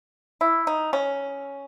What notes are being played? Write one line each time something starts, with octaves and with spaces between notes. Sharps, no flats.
E4
D#4
C#4